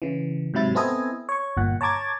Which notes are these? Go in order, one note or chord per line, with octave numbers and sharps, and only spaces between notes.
C#3 E3
G#2 C3 F#3 E4 A6
B3 C4 E4 A4 D#5 G#5
C#5 C#6
G1 A#2 F#5
C#5 A5 A#5 D6 G#6 A6